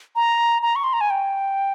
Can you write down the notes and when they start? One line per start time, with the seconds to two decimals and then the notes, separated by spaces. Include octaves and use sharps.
0.16 A#5
0.62 A#5
0.76 C#6
0.84 C6
0.93 A#5
1.01 G#5
1.10 G5